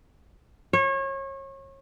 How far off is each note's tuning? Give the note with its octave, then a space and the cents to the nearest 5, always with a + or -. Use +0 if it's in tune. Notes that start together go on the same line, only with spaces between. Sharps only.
C#5 -30